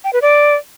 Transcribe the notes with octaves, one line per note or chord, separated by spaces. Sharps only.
G5
B4
D5